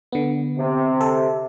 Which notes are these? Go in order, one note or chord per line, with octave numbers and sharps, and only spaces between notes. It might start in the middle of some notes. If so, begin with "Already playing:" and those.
D3 B3
C3
A4